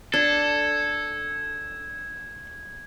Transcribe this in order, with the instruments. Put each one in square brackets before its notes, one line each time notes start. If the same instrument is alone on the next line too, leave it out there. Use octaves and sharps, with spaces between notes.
[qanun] D4 [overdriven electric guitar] A4 [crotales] G#6